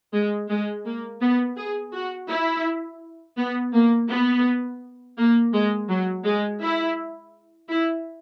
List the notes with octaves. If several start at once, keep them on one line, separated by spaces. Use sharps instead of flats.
G#3
G#3
A#3
B3
G#4
F#4
E4
B3
A#3
B3
A#3
G#3
F#3
G#3
E4
E4